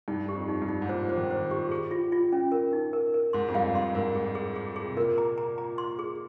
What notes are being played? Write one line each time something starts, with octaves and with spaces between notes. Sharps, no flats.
G2 D#4
G4
F2
D#4
G2
D#4
G#2
A#2 C5
C5
D#3
C5
G4
G#4
F4
F4
C#4
A#4
D#4
A#4
A#4
G#2 C6
F2
G2 F5
G2 C6
G#2 A#4
G#4
G#4
G#4
G#4
C3
A#2 A#4
A#5
A#5
A#5
C6
G#4